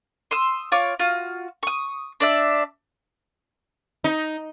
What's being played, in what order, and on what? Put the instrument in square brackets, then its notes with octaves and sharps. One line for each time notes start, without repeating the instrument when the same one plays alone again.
[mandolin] C6 D#6 E6
F4 C#5 C#6 D6
F4 F#4
C#6 D#6
D4 D5 E5
[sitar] D#4